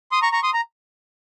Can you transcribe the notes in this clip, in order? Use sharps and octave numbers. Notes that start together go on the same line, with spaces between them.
C6 D#6
A#5 C#6
A#5 C#6
C6 D#6
A#5